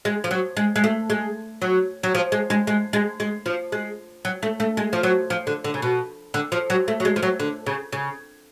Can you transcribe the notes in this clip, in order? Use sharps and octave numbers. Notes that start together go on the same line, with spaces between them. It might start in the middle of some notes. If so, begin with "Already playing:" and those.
G#3
F3
F#3
G#3
G#3
A3
G#3
F#3
F#3
F3
G#3
G#3
G#3
G#3
G#3
F3
G#3
F#3
A3
A3
G#3
F3
F#3
F3
D3
D3
C#3
B2
D3
F3
F#3
A3
F#3
G#3
F3
F#3
D3
C#3
C#3